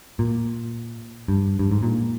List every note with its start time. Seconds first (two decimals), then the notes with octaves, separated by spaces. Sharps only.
0.19 A#2
1.28 G2
1.59 G2
1.72 G#2
1.83 A#2